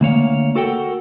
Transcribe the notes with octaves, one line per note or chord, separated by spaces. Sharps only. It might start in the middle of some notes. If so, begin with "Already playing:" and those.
D2 A#3 C#5 F5
F#4 A4 A#4 F#5 G5